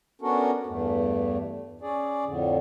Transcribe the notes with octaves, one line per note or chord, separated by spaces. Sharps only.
B3 C#4 D4 F#4 A4 A#4
E2 G2 A3
C#4 G#4 D5
F2 A2 D3